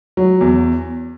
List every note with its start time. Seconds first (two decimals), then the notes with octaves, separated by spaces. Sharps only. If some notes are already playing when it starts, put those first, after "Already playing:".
0.17 F#3
0.41 E2